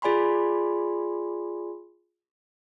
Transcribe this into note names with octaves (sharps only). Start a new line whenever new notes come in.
F4 G#4 D5 G#5 B5 C6